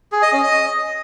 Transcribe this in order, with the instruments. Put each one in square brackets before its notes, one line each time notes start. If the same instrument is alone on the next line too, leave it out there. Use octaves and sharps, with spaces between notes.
[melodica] G#4
D#5
C#4
D#5